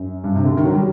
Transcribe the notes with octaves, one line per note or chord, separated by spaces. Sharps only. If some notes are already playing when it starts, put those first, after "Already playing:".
Already playing: F#2
G2
C3
D3
D#3
F#3
G3